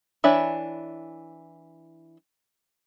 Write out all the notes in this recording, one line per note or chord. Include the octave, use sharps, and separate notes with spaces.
E3 D4 C#5 E5 B5